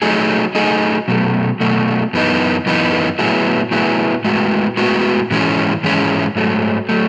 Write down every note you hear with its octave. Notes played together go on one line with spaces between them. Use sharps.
F#3 A3 D#4 G#4
F#3 A3 D#4 G#4
B2 F#3 A3
B2 F#3 A3
F#2 E3 B3 D#4
F#2 E3 B3 D#4
A2 F#3 B3 E4 G#4
A2 F#3 B3 E4 G#4
A2 G#3 B3 F#4
A2 G#3 B3 F#4
G#2 E3 G#3 C#4
G#2 E3 G#3 C#4
G#2 F#3 A3
F#3 A3